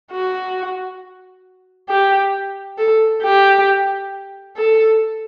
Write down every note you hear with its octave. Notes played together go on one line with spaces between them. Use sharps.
F#4
G4
A4
G4
A4